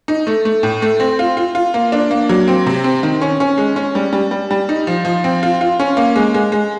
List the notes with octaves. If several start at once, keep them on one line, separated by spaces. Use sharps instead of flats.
D#4
A3
A3
A2
A3
C4
F4
F4
F4
A#3
D4
A#3
F#3
C4
C3
C4
D#3
C#4
C#4
G#3
C#4
G3
G3
G3
G3
D#4
F3
F3
C4
F4
F4
C#4
A#3
G#3
G#3
G#3